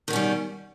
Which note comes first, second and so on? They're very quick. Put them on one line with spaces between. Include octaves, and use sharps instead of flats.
D#3 B2 C#4 G3